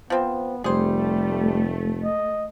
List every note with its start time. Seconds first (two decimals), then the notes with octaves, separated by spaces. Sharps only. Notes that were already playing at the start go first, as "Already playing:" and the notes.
0.10 F3 B3 C4
0.64 F1 G3 A3 G#4 C5
2.03 D#5